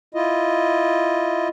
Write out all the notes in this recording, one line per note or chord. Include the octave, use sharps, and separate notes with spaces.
E4 F4 D#5